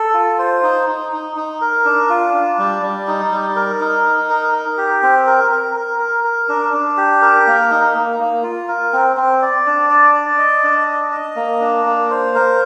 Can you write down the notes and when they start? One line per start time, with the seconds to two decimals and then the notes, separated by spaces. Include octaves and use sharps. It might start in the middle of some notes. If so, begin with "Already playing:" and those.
Already playing: A4
0.14 F4
0.39 C5
0.63 D#4
0.87 D#4
1.12 D#4
1.37 D#4
1.61 A#4
1.85 D4
2.10 F4
2.34 D4
2.58 G3
2.82 G3
3.08 D#4
3.32 G3
3.56 A#4
3.80 D#4
4.05 D#4
4.30 A#4
4.53 A#4
4.77 G4
5.03 C4
5.27 A#4
5.51 A#4
5.76 A#4
5.99 A#4
6.24 A#4
6.49 D4
6.73 D4
6.97 G4
7.22 A#4
7.47 A#3
7.71 D#4
7.95 A#3
8.20 A#3
8.43 F4
8.68 A#4
8.93 C4
9.17 C4
9.42 D5
9.66 D4
9.90 D5
10.15 D5
10.38 D#5
10.64 D4
10.87 D#5
11.12 D#5
11.36 A#3
11.61 D4
11.85 A#3
12.10 C5
12.35 A#4